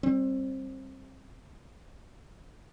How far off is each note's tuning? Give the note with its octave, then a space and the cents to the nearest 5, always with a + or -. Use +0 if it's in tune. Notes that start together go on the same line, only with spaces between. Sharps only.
G3 +0 C4 +25